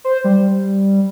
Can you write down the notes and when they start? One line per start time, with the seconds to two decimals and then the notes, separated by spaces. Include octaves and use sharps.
0.04 C5
0.24 G3